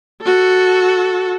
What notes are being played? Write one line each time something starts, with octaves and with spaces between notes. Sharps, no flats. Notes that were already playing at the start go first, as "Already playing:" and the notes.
F#4 A4